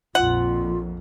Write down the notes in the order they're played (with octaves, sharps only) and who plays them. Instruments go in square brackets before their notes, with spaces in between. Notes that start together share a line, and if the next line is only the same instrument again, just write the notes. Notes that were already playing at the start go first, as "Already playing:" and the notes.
[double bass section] A#1 F2 A#2 [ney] F4 [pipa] F#5